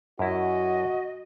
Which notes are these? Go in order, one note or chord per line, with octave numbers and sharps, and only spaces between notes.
F#2 E4 F#4 D#5